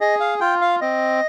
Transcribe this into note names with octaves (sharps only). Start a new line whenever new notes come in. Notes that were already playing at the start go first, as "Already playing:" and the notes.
G#4 D#5
F5
F4 G5
F5
C4 D#5